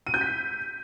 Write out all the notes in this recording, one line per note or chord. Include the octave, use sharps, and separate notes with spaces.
D#7
G6
B6